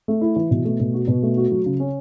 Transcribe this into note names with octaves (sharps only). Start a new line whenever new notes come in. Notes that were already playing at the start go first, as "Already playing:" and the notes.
A3
E4
E3
B2
A3
B2
F#4
B2
A3
F#4
F#3
C#3
C#4